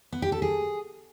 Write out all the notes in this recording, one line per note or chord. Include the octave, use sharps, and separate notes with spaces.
B3
G4
A4
G#4